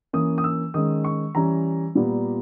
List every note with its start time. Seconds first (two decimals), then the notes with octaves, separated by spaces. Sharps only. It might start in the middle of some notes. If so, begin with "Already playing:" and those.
0.13 E3 A#3 C#4 D#6
0.38 D#6
0.44 E6
0.74 D#3 G#3 C#4 D#6
1.04 C#6
1.35 E3 G3 C#4 A#5
1.95 A#2 G3 B3